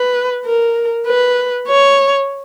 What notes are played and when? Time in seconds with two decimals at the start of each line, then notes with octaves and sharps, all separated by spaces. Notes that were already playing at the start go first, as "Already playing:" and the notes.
Already playing: B4
0.45 A#4
1.07 B4
1.68 C#5